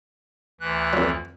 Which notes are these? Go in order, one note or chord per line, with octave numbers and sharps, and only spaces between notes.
D2 E3 F#6
F2 F#3